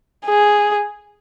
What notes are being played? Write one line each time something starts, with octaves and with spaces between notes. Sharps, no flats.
G#4